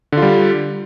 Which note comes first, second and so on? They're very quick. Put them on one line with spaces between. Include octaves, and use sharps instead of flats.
D3 F4 G3